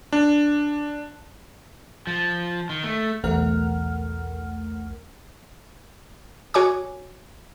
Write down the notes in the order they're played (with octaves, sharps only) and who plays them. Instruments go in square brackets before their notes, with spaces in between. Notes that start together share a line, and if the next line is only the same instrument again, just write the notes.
[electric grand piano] D4
[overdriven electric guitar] F3
D#3
A3
[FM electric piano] B1 E2 A3 A#4 F#5 F6
[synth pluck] F#4 C#5 G#5 D6